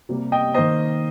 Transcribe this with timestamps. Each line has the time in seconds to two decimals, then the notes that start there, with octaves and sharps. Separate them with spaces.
0.09 C3 G3 A#3
0.32 D#5 G5
0.54 D#3 A#3 C5 D#5